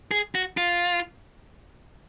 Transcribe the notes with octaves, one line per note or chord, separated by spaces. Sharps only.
G#4
F#4
F4